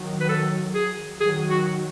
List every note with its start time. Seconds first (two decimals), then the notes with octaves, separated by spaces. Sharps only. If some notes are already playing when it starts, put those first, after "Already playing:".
Already playing: D#3 F#3
0.20 B4
0.29 A4
0.74 G#4
1.20 D#3 F#3 G#4
1.50 F#4